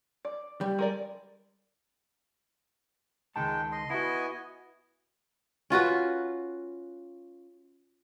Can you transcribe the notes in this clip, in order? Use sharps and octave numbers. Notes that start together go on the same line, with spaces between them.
D5
G3
G#3 A#4 D5
C#2 D#3 G#3 G5 A5
D#5 C6
B3 E4 F#4 D#5 G#5
C#4 F4 F#4 B4